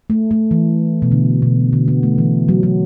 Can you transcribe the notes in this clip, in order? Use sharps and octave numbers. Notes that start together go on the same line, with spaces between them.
A3
A3
E3
B2
D3
B2
D3
B3
A3
E3
F#3
F#3